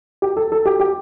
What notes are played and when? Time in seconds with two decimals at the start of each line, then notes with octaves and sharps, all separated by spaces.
0.22 G4
0.37 A4
0.52 A4
0.66 G4
0.80 G4